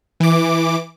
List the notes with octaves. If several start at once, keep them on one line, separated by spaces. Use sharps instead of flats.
E3 D6